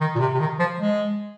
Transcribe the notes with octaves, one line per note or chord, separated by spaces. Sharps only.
D#3
A#2
C3
C3
D#3
F3
G#3